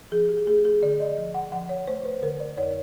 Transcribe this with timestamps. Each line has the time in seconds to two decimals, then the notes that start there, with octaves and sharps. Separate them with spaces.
0.11 F3 G#4
0.29 G4
0.47 A3 G#4
0.65 G#4
0.82 D3 D5
1.00 D#5
1.18 F3
1.34 F#5
1.52 F3 F#5
1.69 C#5
1.87 A3 C5
2.05 B4
2.22 D3 A#4
2.40 D5
2.57 F2 C#5